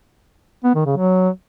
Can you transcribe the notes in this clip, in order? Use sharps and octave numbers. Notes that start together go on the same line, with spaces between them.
B3
D#3
C#3
F#3